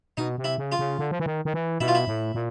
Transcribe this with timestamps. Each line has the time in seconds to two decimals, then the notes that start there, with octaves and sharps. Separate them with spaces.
0.17 B2 D#4
0.38 C3
0.44 E4
0.58 C#3
0.72 F4
0.79 C#3
0.99 D3
1.11 F3
1.20 E3
1.26 D#3
1.45 D#3
1.54 E3
1.80 B2 E4
1.88 F4
1.95 E4
2.07 A2
2.34 A#2